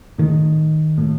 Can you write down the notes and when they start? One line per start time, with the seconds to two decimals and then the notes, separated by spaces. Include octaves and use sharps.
0.18 A2 D#3
0.98 A2